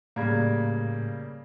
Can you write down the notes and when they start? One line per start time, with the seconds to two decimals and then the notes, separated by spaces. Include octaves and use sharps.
0.16 A2 C#3 G3 A#3 G#6